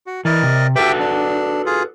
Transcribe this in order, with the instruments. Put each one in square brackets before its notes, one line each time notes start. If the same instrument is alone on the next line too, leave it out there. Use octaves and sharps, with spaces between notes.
[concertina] F#4
[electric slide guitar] E3 [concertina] A#4 D5 D#5
[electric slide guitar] C3
[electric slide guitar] F#4 A4 B4 [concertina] G4 E5 G5
[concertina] D4
F4 G#4